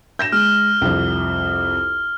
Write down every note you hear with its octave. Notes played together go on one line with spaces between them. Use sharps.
G6 A#6 E7
G#3 F6
C2 F2